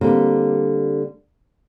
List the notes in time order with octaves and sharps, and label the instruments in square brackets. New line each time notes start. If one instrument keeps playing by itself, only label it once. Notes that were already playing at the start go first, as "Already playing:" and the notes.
[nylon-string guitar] D3 G3 A#3 C4